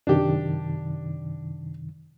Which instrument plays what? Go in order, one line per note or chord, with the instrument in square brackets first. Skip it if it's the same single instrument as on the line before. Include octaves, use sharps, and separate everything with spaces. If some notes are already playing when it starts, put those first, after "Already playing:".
[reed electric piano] F#2 C3 D#3 [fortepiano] D4 G4